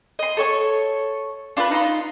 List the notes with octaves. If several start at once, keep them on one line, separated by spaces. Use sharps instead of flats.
D#5 C6
A4 C#5 C#6
D4 F4 A#4 B4
D#4 F4 C6